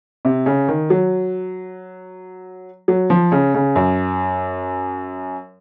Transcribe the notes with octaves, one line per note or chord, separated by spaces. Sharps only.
C3
C#3
D#3
F#3
F#3
F3
C#3
C#3
F#2